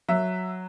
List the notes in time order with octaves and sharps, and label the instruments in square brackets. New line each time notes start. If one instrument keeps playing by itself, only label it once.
[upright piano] F#3 E5